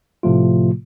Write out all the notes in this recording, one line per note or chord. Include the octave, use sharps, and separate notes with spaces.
A2 C3 F3 A3 F4